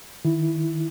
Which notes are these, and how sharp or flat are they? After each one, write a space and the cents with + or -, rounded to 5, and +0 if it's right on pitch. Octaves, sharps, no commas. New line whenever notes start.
D#3 +0 E4 +0